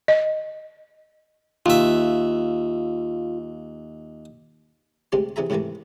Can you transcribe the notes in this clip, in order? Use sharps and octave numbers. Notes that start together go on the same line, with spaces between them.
D#5
D#2 F4 E5
D2 C3 G#3 D4 G4 C6
C3 E3 G#4 E5 A#5
G#2 C3 D#3 E3 A3 A#3